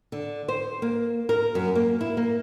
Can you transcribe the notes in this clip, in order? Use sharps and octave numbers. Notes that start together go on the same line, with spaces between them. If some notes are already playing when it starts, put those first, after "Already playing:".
D3
C5
A#3
A#4
F#2
A#3
E4
A#3